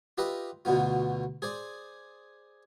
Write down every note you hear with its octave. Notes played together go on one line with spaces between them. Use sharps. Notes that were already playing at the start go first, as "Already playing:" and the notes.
F4 G4 B4 D#5 E5
D2 B2 D3 B3 F4
G#4 C5 D5